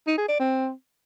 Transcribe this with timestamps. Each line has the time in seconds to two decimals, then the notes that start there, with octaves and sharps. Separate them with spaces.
0.07 D#4
0.18 G#4
0.29 D5
0.39 C4